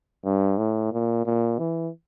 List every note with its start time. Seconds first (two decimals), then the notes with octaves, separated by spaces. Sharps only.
0.25 G2
0.58 A2
0.92 A#2
1.25 A#2
1.59 E3